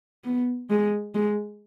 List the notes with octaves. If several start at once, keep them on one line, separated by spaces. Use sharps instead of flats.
B3
G#3
G#3